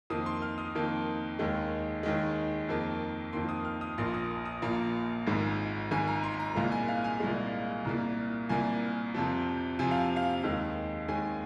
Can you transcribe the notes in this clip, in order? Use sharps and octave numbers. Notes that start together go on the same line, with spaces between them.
F2 D#3 A#3 D#6
C6
F6
D#6
F2 D#3 A#3
D#2 D#3 G#3
D#2 D#3 G#3
F2 D#3 A#3
F2 D#3 A#3 C6
D#6
F6
D#6
A#1 A#2 A#3 C6
D#6
D#6
A#1 A#2 A#3 A#5
G#1 G#2 G#3
G#1 G#2 G#3 G#5
A#5
C6
A#5
C2 A#2 G#3 F5
G#5
F5
G#5
C2 A#2 G#3
C2 A#2 A#3 A#5
C2 A#2 A#3 G#5
F2 C3 F3
F2 C3 F3 G#5
F5
F5
D#2 D#3 G#3
D#2 D#3 G#3 G#5